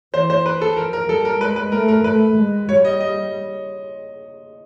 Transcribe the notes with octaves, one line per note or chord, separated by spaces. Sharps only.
E3 C5
C5
B4
A4
F3 A#4
A#4
G3 A4
A#4
G#3 B4
B4
A3 A#4
A#4
A3 B4
G#3
G3 C#5
D#5
D#5